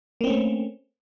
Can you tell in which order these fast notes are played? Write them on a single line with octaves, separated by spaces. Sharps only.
A#3 C4 C#4 A3